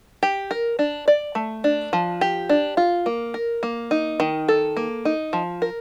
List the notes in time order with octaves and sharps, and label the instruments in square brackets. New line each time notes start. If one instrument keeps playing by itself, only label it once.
[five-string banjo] G4
A#4
D4
D5
A3
D4
F3
G4
D4
F4
A#3
A#4
A#3
D#4
D#3
A4
A#3
D#4
F3
A#4